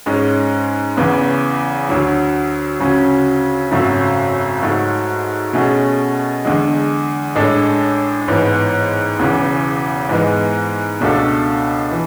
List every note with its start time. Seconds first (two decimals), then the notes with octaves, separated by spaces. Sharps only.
0.06 G#2 G#3 C#4
0.97 E2 C#3 E3 B3
1.89 D2 D3 F#3
2.79 D2 C#3 F#3 C#4 F#4
3.71 G#1 F#2 C#3 F#3 A3
4.62 G#2 F#3 A3
5.53 B2 A3 C#4 G#4
6.45 E2 D3 G#3
7.36 A1 A2 G#3 D4 A4
8.28 A1 G#2 E3 B3
9.19 E1 E2 C#3 E3
10.09 G#2 E3 G#3 B3
11.01 C#2 B2 A3 D4 A4
11.91 E3